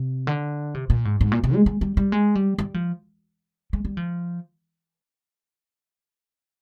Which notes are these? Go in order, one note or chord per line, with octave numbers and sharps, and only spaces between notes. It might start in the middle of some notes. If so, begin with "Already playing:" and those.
Already playing: C3
D3
C3
A#2
G#2
G#2
A#2
C3
G#3
G#3
G3
G3
G#3
G3
G3
F3
G#3
G3
F3